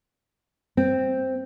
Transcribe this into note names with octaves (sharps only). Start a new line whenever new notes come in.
C4